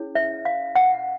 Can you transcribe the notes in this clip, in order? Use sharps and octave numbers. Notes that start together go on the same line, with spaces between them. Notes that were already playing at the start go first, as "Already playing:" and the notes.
Already playing: C#4 E4 G#4 C#5
E5
F5
F#5